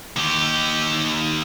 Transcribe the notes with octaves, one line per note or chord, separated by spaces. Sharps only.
D#2 G4